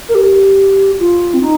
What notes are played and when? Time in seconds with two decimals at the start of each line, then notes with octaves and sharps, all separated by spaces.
0.09 A#4
0.15 G4
0.99 F4
1.34 C4
1.41 D#4